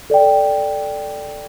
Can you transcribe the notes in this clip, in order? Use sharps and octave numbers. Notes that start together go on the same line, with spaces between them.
A4 D5 G5